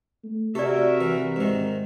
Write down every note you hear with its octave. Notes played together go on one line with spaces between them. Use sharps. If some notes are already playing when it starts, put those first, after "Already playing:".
A3
C3 F#4 G4 A4 A#4 D5 E5
E3
G#2 D#3